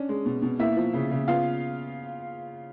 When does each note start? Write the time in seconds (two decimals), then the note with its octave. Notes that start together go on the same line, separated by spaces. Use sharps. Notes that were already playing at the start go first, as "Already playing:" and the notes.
Already playing: C#4 D4
0.09 G#3
0.26 B2
0.42 B2
0.59 A#3 E4 E5
0.77 F3
0.94 C#3
1.11 C#3
1.28 B3 F4 F5